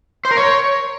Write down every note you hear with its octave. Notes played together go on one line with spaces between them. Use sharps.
C5
A#4
C#5